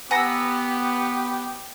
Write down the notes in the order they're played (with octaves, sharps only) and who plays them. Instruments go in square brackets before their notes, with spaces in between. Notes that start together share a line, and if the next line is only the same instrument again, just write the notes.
[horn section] B3 [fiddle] G4 [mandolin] F#5 B5 E6 [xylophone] G#5 A#5 A#6